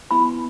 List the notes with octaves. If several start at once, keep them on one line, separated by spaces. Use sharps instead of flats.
B3 E4 B5